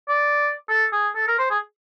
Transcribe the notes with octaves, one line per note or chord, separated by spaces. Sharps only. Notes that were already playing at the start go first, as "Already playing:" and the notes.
D5
A4
G#4
A4
A#4
C5
G#4